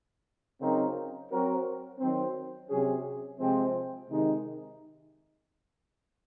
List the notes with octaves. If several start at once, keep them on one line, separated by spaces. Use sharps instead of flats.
C#3 F#3 C4 D#4 A#4
F#3 C4 F#4 A#4
D#3 F#3 C4
C3 F#3 C#4 G#4
C3 F3 G#3 C4
C3 D#3 G#3 D#4